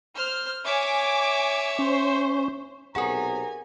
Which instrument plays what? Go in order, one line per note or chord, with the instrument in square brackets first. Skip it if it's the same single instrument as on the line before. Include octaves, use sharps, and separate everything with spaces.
[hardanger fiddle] C5 [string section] F6
[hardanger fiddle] C#5 E5 [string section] G#5 D6
[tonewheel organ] C#4 [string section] C5
[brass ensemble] B1 C3 A#5 [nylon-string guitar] G4 F#5 [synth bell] G#4 A#4 [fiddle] G#5